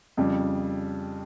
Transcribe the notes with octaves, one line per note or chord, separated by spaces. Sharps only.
F2 C#3 G3